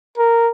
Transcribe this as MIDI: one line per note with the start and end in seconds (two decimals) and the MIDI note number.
0.18 0.50 70